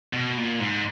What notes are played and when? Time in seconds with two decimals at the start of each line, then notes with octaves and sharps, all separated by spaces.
0.13 B2
0.37 A#2
0.60 G#2